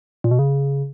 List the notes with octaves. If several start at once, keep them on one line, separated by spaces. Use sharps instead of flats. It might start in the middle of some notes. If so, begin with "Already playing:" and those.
A#2
B2
C#3